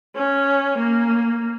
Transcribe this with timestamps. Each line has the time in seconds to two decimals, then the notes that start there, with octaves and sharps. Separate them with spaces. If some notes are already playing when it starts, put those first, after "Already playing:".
0.15 C#4
0.78 A#3